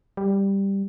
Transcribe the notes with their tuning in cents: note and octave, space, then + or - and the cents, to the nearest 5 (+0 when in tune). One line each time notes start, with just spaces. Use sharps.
G3 +5